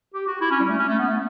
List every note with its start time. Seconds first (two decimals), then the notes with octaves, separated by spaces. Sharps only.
0.14 G4
0.27 F#4
0.41 E4
0.51 C#4
0.60 G3
0.69 A3
0.79 C#4
0.89 A3
0.99 B3
1.08 A3